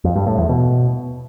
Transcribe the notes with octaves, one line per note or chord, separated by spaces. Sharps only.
F2
G2
A2
E2
B2